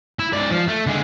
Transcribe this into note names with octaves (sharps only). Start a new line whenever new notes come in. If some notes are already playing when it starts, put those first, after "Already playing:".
E4
G#2 D5
F3
A3
D3 G#3